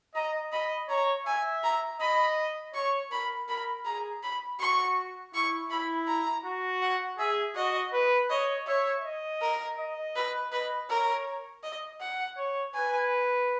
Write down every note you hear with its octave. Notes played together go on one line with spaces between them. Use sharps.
D#5 A#5
D#5 B5
C#5 A#5
E5 G#5
A#5
D#5 B5
C#5 C#6
A#4 B5
A#4 B5
G#4 A#5
B5
F#4 C#6
E4 C#6
E4 B5
A#5
F#4
F#5
G#4 E5
F#4 D#5
B4
C#5 D#5
C#5 E5
D#5
A#4
D#5
B4
B4 D#5
A#4 C#5
D#5
F#5
C#5
B4 G#5